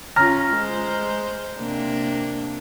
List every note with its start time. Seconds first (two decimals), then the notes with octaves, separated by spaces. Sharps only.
0.16 C#4 F4 A#5 F6 A#6
0.54 G#3 C5
1.59 C3 A#3 D4